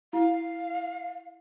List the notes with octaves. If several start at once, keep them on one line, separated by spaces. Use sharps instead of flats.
E4 F5